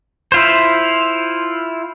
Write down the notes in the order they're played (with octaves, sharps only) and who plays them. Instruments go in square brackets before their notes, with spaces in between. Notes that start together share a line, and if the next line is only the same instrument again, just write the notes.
[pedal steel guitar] E4 F4 C5